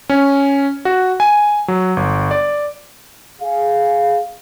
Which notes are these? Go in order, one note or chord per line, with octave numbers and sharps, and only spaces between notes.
C#4
F#4
G#5
F#3
G1
D5
G#4 F5